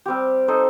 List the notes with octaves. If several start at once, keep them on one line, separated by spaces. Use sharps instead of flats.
G3 C4 G4
D#4 A4 C5 D#5